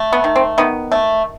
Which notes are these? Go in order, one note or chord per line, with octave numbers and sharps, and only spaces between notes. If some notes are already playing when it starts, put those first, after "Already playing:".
Already playing: A3
B3
D#3
C4
D#3 B3
A3